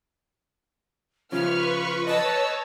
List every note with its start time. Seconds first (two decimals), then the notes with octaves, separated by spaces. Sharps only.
1.32 C#3 F3 F4 B4 C#6 F6
2.07 B4 C#5 D#5 A5 E6